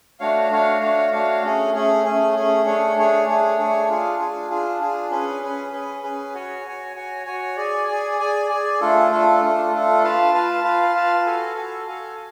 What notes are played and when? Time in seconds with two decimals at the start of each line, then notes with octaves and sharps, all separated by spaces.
0.20 A3 D4 F#4 C#5 F5
0.50 A3 D4 F#4 C#5 F5
0.81 A3 D4 F#4 C#5 F5
1.12 A3 D4 F#4 C#5 F5
1.42 A3 C#4 G#4
1.74 A3 C#4 G#4
2.04 A3 C#4 G#4
2.36 A3 C#4 G#4
2.66 A3 D4 G#4 C#5
2.97 A3 D4 G#4 C#5
3.27 A3 D4 G#4 C#5
3.58 A3 D4 G#4 C#5
3.89 D4 F4 G#4
4.19 D4 F4 G#4
4.50 D4 F4 G#4
4.80 D4 F4 G#4
5.11 C#4 G#4 B4
5.42 C#4 G#4 B4
5.72 C#4 G#4 B4
6.03 C#4 G#4 B4
6.34 F#4 C#5 G#5
6.65 F#4 C#5 G#5
6.96 F#4 C#5 G#5
7.26 F#4 C#5 G#5
7.57 G#4 D5 G#5
7.87 G#4 D5 G#5
8.19 G#4 D5 G#5
8.49 G#4 D5 G#5
8.80 A3 D4 F4 A4
9.10 A3 D4 F4 A4
9.41 A3 D4 F4 A4
9.71 A3 D4 F4 A4
10.03 F4 B4 F5 A5
10.33 F4 B4 F5 A5
10.64 F4 B4 F5 A5
10.94 F4 B4 F5 A5
11.26 F#4 A4 F5 G#5
11.55 F#4 A4 F5 G#5
11.86 F#4 A4 F5 G#5